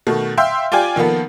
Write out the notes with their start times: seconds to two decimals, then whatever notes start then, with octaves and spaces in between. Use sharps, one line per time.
0.07 B2 D#3 A3
0.38 E5 F5 G5 C6 E6 G6
0.72 F4 G4 D5 G5 G#5
0.96 D#3 F3 A#3 B3 A4